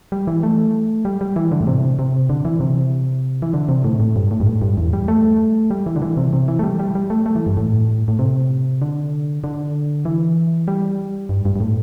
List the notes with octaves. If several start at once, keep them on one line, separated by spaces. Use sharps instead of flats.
G3
E3
A3
G3
G3
E3
D3
A2
C3
C3
D3
E3
C3
E3
D3
C3
A2
A2
G2
A2
G2
A2
G2
E2
G3
A3
G3
E3
D3
E3
C3
C3
E3
A3
G3
G3
G3
A3
A3
E3
G2
A2
A2
C3
D3
D3
E3
G3
G2
G2
G2
A2